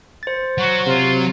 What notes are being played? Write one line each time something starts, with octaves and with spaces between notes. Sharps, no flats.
C5 A6
F#3 F#4
C3 F4